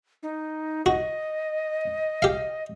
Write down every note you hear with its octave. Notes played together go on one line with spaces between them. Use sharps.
D#4
F#4 D#5
G4 F5